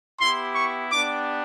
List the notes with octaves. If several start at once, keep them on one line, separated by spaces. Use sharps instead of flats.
B3 E4 G4 C6
C#6
B3 D4 G4 D6